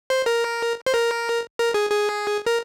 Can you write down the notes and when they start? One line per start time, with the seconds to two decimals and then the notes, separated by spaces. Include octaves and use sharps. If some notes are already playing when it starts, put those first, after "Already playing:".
0.10 C5
0.26 A#4
0.86 C5
0.93 A#4
1.58 A#4
1.74 G#4
1.91 G#4
2.46 A#4